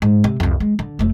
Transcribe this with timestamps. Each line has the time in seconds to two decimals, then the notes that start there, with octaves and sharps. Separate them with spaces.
0.02 G#2
0.24 C3
0.40 C2 F2
0.60 G#3
0.79 D3
0.99 F1 A3